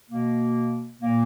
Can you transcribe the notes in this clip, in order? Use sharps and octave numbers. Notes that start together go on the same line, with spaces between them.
B2 A#3
A#2 A#3